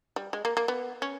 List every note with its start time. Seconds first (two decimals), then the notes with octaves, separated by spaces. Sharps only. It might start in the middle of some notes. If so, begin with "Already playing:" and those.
0.16 G3
0.33 G#3
0.45 A#3
0.57 A#3
0.68 B3
1.02 C#4